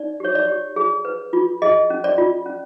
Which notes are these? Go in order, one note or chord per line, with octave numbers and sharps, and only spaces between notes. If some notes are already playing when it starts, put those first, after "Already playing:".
Already playing: D#4 D5
G4 C#5
D5
G4
G#4
B4
F4
G#4 D#5
C#4
D5
F4
C#4